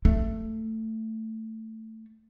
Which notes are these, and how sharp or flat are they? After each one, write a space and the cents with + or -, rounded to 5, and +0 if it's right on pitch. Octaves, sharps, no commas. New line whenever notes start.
A3 +15